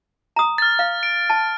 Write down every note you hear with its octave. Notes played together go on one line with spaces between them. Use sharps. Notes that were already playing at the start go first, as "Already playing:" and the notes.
A#5 D#6
F6 A6
F5
D7
A5